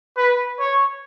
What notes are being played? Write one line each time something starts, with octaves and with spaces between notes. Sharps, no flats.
B4
C#5